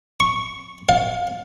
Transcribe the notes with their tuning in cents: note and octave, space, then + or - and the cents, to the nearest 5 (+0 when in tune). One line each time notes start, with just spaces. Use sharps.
C#6 -5
F5 +25